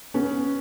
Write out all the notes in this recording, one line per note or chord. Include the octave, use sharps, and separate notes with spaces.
B3 C#4